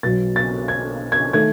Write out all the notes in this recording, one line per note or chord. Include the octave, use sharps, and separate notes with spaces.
B1 B2 F#3 A6
A6
G#6
G#6
D#3 A3 G#6